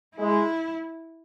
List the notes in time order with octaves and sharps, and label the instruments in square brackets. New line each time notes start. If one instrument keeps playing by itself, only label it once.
[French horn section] G#3 [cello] E4